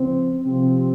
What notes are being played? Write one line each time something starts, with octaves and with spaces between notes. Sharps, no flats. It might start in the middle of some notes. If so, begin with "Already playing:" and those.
Already playing: C#3 F3 C4
C3 F3 C4